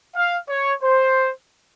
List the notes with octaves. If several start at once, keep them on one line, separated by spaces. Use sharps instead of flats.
F5
C#5
C5